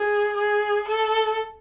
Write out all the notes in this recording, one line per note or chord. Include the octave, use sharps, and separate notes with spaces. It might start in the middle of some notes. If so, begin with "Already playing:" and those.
Already playing: G#4
G#4
A4